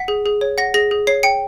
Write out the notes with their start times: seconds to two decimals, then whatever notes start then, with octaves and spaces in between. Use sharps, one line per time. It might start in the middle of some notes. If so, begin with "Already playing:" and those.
Already playing: F#5 B6
0.08 G#4
0.26 G#4
0.41 C#5
0.58 F#5 A#6
0.74 G#4 A#6
0.91 G#4
1.07 C#5 C7
1.23 G5 C#7